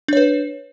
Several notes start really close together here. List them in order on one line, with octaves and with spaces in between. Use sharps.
D4 C#5 B4